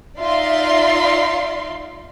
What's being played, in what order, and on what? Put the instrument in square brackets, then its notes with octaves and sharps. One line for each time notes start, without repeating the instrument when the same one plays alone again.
[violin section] D#4 F4 D5 E5 F5 C6